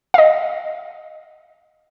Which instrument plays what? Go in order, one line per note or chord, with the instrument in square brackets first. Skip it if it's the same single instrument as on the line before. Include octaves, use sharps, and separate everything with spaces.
[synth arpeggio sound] D#5 F5